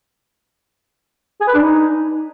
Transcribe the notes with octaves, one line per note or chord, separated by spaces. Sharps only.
G#4
B4
D4
D#4